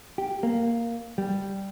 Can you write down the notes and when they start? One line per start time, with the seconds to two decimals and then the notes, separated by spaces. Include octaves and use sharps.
0.18 G4
0.43 A#3
1.18 G3